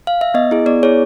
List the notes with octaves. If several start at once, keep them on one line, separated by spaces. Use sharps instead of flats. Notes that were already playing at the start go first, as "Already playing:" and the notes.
F5
E5
B3 D#5
E4 G#4
B3 D5
E4 G#4 C#5